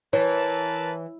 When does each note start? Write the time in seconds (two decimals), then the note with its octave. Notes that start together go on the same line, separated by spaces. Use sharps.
0.13 E3 A#4 B4 C#5 A5